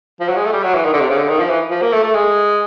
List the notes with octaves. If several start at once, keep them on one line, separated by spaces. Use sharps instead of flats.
F3
F#3
G#3
A3
G3
F#3
E3
D#3
D3
C3
C#3
D3
D#3
F3
E3
F3
A#3
A3
A3
G#3